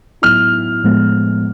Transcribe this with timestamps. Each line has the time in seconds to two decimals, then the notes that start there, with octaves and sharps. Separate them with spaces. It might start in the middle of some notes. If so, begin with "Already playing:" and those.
0.22 A2 F#3 B3 E4 F6
0.84 A2 F3 G#3 B3